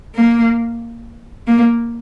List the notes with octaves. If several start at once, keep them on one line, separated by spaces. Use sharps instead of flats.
A#3
A#3